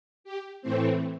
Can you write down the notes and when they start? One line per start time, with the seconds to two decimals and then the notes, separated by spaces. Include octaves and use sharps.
0.24 G4
0.62 A2 E3 A3 C4 C5